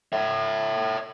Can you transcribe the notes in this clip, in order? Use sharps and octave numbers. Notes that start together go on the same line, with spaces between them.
C#5 E5